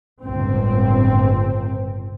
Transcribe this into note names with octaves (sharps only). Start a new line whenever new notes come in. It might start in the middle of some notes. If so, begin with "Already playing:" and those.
G1 C#2 A2 C4